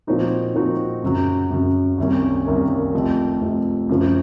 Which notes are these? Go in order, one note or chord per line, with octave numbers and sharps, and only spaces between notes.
A#2 F3 C4 D#4 F#4
A#2 F3 C4 D#4 F#4
F#2 C#3 F#3
F#2 C#3 F#3
C2 C3 D#3 A#3 C#4
C2 C3 D#3 A#3 C#4
F1 F2 C3
F1 F2 C3
F#2 C#3 F3